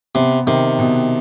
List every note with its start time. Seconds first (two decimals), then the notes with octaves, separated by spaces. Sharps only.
0.15 C3 B3
0.47 C3 D#3
0.79 B2